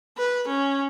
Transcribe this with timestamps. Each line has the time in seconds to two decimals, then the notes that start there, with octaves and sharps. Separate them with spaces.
0.18 B4
0.47 C#4